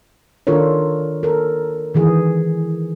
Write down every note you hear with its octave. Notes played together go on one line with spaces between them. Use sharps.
D#3 D4 F4 A4 A#4 C#5
A4 A#4
D#3 E3 G#4